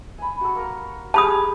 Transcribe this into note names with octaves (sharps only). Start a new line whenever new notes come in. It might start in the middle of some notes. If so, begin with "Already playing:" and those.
G#5 B5
F#4 A4
A#3 A#4 C#6
G4 G#4 G#5 A5 B5 D#6